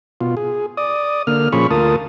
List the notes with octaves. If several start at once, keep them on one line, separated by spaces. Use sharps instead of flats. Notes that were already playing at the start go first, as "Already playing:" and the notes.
B2 F4
G#4
D5 D#6
D3 A#3 F6
A#2 F3 C#4 G#4 B5 C#6
D2 F4 A#4 A5 D#6